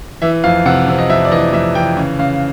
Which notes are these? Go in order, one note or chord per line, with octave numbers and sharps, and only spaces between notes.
E3 E5
F2 F5
C3 F#5
C3
D#5
F2 E5
D5
E3 D#5
F2 E5
E3 G5
C#3
C#3 F5